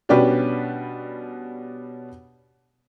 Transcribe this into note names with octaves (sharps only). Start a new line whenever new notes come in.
B2 G3 C#4 D4 G4 B4